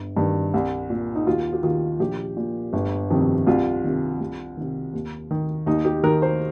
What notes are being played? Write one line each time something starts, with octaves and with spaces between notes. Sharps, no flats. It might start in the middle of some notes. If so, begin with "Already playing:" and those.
Already playing: G1
G2 D#3
C2
A#2
D#4
D#2 F4
G4
D#3 F4
A#1 G4
A#2
G1
F2 C3 D#3
C2 F4
C3 D#3
C2
C3 D#3
D#2
D#3
D#2 D#4
G4
D#3 A#4
C5